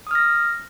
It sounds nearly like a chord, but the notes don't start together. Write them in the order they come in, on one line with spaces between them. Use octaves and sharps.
D#6 F6 A#6